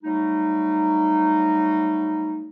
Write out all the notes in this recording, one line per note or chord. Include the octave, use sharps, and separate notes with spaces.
F#3 G3 A3 D#4